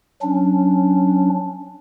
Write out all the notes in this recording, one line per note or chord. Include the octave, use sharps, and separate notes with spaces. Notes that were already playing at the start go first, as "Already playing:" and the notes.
F#3 C#4 D4